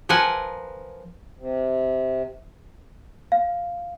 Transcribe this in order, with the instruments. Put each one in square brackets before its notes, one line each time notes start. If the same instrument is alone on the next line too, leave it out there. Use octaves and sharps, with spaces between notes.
[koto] F3 A#4 B4 F#5 G#5
[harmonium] C3
[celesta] F5